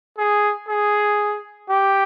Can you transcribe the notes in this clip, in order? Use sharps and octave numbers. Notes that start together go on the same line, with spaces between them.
G#4
G#4
G4